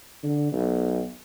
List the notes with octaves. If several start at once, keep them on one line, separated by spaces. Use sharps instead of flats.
D3
B1